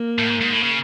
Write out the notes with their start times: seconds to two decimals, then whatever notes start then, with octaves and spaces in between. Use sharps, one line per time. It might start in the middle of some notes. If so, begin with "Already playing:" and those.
Already playing: A#3
0.18 A2
0.30 G#2
0.41 G#2
0.51 A2
0.63 C#3